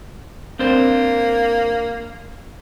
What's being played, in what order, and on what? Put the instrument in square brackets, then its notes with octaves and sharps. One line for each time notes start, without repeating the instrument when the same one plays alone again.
[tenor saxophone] A#3 [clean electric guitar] C4 D4 C5